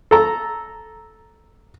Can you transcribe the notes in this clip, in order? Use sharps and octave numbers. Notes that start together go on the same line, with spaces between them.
A4 A#5